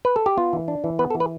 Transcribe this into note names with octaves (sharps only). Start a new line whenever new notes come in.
B4
A4
G4
B3 F4
E3
D4
E3
B3 B4
A4
E3
B4